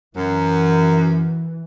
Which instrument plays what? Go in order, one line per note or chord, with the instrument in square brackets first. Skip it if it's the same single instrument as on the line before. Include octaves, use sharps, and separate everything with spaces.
[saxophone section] F#2 [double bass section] E3